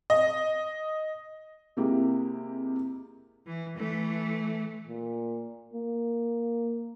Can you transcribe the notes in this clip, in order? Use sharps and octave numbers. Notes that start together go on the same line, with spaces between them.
D#5
C3 G#3 A#3 E4 G4
E3
E3 A3
A#2
A#3